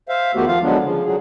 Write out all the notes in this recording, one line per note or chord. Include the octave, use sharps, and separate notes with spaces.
C5 E5 F5
E2 D#3 A3 B3 F#4 G4
F3 F4 F5
D3 F3 F#3 G#3 B3 D4
C#3 F3
D3 F#3 G#4